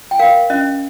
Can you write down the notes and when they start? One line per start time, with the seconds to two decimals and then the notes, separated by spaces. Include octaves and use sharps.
0.11 G5
0.19 A#4 F5
0.50 C#4 D#5